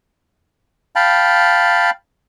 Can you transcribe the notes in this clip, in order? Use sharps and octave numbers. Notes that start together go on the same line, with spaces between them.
F5 G5 A5 B5